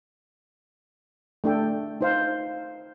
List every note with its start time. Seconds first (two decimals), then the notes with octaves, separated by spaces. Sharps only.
1.44 A3 D4 A4 G5
2.01 D#4 C5 F5